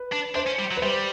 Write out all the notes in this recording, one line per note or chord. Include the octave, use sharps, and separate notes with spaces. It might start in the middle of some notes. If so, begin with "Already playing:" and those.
Already playing: B4
D4
D4 C5
C#4
G3
F#3
B4
G3 C5